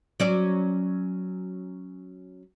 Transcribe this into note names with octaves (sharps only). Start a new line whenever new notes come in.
F#3 C#4 D5